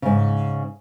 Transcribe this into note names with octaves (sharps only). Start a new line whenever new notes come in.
G#2 C#3